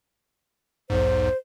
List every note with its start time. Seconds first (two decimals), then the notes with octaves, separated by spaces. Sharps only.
0.90 B1 E2 G#2 C5